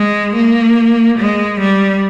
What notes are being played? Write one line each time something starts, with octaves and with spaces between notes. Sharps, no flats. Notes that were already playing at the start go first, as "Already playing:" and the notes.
Already playing: G#3
A#3
G#3
G3